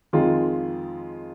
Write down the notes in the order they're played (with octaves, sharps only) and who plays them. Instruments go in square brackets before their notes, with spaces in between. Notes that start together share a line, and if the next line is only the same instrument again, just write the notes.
[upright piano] F2 D#3 G#3 F4